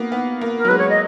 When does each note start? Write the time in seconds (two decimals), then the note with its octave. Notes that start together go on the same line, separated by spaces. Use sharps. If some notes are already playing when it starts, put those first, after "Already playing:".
Already playing: A#3 B3
0.12 B3
0.41 A#3
0.58 A#4
0.65 F#3
0.68 G#3 B4
0.78 C#5
0.90 D#5